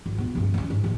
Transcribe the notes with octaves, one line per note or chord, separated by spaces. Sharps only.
G#1
A#2 B3
C#2 G2
B3 C#4
G#2
D#1 A2